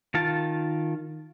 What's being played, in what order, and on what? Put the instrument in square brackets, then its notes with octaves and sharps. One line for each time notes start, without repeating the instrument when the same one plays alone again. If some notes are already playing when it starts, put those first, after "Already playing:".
[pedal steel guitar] D#3 F4 A5